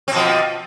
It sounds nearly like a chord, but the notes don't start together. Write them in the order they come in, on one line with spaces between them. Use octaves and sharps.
C4 B2 F3